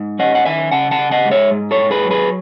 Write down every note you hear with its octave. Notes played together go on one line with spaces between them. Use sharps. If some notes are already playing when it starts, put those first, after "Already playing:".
Already playing: G#2
C#4 D#5 F#5
F#5
D#3 E5 G#5
C#3 F#5 A5
F#5 A5
C#3
D#5 F#5
G#3
C#5 E5
G#2
A4 C#5
G#2
G#4 B4
F#3
G#4 B4